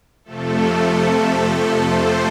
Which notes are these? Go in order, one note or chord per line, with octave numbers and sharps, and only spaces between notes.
F2 C3 F3 A3 A4
A4
C5